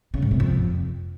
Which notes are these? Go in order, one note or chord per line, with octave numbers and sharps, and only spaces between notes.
C#3
G#2
C3
F2